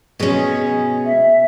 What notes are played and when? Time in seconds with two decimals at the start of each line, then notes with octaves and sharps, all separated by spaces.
0.20 B2 G#3 C#4 G#4
1.05 E5